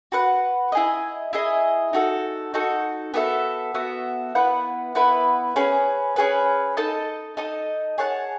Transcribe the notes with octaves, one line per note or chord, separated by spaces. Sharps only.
F#4 B4 F#5
E4 G#4 D#5
E4 G#4 D#5
D#4 F#4 A4
D#4 F#4 A4
B3 F#4 A4 E5
B3 F#4 A4 E5
B3 E4 B4 F#5
B3 E4 B4 F#5
C#4 G#4 B4
C#4 G#4 B4
D#4 A4 D#5 A5
D#4 A4 D#5 A5
G#4 C#5 F#5 A5